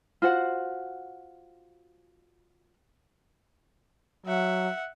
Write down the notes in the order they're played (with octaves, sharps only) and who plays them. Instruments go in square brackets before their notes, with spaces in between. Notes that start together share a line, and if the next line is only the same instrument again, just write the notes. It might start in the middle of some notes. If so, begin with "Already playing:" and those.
[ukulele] F4 F#4 C5 F#5
[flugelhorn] F#3 [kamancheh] E5 F#5